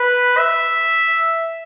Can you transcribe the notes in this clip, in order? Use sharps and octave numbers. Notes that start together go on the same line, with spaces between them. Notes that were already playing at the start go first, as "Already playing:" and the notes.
Already playing: B4
E5